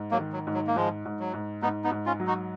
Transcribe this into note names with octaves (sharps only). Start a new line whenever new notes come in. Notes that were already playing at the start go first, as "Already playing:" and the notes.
Already playing: G#2
F#3 A#3
D#3
F#3
G#2
F#3
A#3
G#2 F3 G#3
G#2
F#3
G#2
G#2 B3 D#4
B3 D#4
G#2
C#4 F4
F#3
D#4 F#4